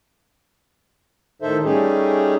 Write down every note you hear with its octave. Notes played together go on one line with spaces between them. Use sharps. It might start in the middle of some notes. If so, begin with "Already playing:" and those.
A2 D#3 D#4 A4 C5 E5
G3 A3 C#4 D#4 G4 G#4